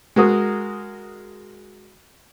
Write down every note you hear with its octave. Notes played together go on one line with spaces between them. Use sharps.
G#3 F#4 A#4 D#6